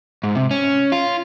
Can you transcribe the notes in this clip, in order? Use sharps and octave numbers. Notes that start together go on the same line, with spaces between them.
G#2
C3
C#4
F4